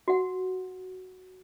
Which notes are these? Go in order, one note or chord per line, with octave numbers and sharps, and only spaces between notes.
F#4 F#5